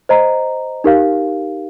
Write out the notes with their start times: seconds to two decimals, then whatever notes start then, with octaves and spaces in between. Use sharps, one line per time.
0.09 C5 D#5 A#5
0.84 D#4 G4 A#4 F5